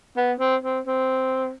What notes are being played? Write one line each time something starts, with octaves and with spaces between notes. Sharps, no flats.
B3
C4
C4
C4